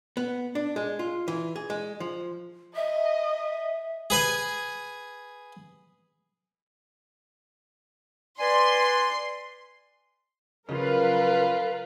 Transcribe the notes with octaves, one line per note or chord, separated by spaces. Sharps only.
B3
D4
G#3
F4
E3
G#4
G#3
F3
D#5 E5
G#4 B4 G#5
B4 D5 G#5 C6
C#3 F3 F#3 F4 A#4 B4